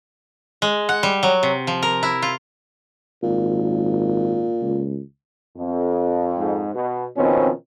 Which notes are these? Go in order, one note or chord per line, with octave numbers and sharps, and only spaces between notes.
G#3
F#5
G3
F#3
C3
F3
A#4
E4
F4
G#1 A#2
C#2
F2
G#2
B2
B2 D#3 F3 C4 C#4